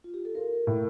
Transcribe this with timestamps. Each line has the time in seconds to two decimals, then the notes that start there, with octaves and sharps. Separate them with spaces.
0.04 F4
0.14 G4
0.25 A4
0.35 F4 A#4
0.67 A2